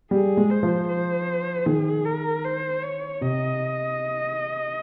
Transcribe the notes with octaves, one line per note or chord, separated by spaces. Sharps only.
G3 G#4
G#3
C5
F3
C5
D#3 G#4
A#4
C5
C#5
C3 D#5